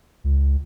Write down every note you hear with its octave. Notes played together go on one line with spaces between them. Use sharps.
C#2